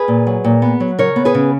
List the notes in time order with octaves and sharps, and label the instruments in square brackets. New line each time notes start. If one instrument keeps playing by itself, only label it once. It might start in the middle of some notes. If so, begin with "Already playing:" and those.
Already playing: [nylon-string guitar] G#4 B4
A#2
F#3
A#2
B3
F#3
C#3 A#4 C#5
B3
G#4 B4
C#3